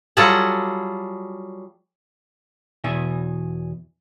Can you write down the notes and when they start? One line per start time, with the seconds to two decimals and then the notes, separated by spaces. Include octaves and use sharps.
0.17 F#3 G3 F4 G#4 A4 F#5
2.84 E2 B2 E3 G#4 E5